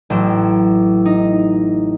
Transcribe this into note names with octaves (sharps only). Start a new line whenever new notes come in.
A1 F#3 G5 E7
D#4